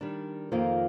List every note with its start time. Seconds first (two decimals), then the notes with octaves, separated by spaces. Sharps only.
0.01 D#3 G3 D4
0.52 F2 D#3 A#3 F4 C5